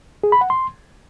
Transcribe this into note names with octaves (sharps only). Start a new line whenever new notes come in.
G#4
B5
F#5
C6